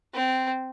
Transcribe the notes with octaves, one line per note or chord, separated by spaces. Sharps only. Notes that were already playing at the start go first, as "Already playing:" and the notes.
C4